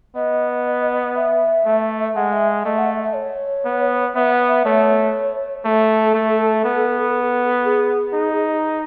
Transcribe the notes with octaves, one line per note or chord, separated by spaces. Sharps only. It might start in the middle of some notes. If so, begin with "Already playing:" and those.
B3 D#5
E5
A3
G#3 F#5
E5
A3 D#5
F#5
E5
E5
C#5
B3
B3 E5
E5
A3 C#5
A3 A4
A3
B3
G#4
D#4